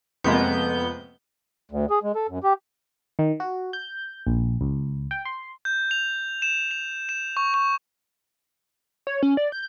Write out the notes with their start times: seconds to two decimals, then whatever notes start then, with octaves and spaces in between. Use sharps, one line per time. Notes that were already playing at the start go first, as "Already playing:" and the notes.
0.24 F2 C3 G#3 A#3 B3 G6
1.71 D2
1.90 G#4
2.03 G#3
2.15 A4
2.29 F#2
2.43 G4
3.19 D#3
3.40 F#4
3.73 G6
4.27 A#1
4.61 C#2
5.11 G5
5.25 C6
5.65 G6
5.91 F7
6.42 E7
6.71 F7
7.09 E7
7.37 C#6
7.54 C#6
9.07 C#5
9.23 C#4
9.37 D5
9.52 G6